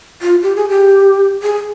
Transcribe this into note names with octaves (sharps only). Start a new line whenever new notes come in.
F4
G4
G#4
G4
G#4